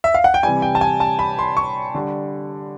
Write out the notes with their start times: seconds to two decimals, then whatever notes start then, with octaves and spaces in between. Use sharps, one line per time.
0.04 E5
0.14 F5
0.24 F#5
0.34 G5
0.43 C3 E3 G3 G#5
0.62 G5
0.75 A5
0.81 G#5
1.00 A5
1.19 B5
1.39 C6
1.57 C#6
1.94 D3 G3